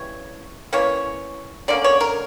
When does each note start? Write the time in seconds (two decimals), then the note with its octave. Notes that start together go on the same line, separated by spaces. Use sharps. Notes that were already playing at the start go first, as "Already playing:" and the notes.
Already playing: C#3 E3 G3 C#5
0.73 E3 A#3 C#4 C#5
1.68 D3 A#3 C#4 D5
1.84 C#5
2.00 A#4